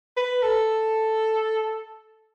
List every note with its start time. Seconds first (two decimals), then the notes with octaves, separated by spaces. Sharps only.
0.17 B4
0.43 A4